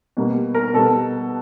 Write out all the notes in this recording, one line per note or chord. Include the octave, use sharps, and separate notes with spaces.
B2 G3 A#3
A#4
B2 G3 B3 A4